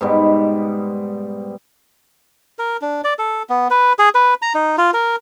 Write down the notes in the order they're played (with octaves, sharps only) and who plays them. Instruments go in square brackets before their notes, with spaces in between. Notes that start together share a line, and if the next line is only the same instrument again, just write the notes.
[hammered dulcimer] G#2 B2 G3
[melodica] A#4
D4
D5
A4
B3
B4
G#4
B4
A#5
D#4
F4
A#4